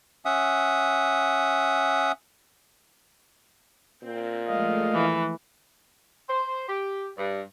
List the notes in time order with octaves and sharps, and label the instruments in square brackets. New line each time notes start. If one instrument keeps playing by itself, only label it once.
[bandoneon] C#4 E5 F#5 D#6
[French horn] A#2 [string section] C4
[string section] F3 G#3 A3 [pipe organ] D#5 F5
[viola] E3
[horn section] C5
G4
G2